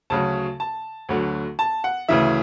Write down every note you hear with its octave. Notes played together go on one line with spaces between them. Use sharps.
D2 C#3 F#3 A5
A5
D2 D3 F#3
A5
F#5
D2 C#3 E3 E5